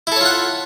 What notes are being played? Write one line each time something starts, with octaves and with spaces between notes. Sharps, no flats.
E4 F4 A4 C#5 F#5